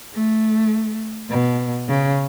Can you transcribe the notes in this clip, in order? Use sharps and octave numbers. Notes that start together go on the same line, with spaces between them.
A3
B2
C#3